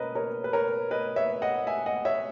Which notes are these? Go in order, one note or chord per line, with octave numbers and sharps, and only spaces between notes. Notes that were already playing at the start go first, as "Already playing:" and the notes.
Already playing: B2 A#3 C#4 A#4 B4 C#5 D#5
A#4 C#5
B4
A#4 C#5
B4 D#5
C#5 E5
D#5 F#5
E5 G#5
D#5 F#5
C#5 E5